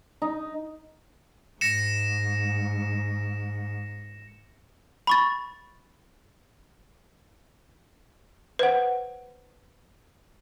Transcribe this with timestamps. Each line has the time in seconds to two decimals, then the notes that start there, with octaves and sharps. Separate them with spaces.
0.22 D#4
1.61 G#2 A#6 C#7 E7
5.07 B5 C#6 A6
8.59 B4 C5 F#5